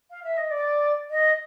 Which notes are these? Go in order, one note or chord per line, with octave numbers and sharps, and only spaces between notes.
F5
E5
D#5
D5
D#5